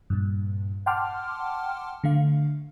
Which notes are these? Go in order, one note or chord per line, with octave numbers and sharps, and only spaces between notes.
G2 A#2
F#5 G5 A5 C6 D6 F6
D3 A3 F5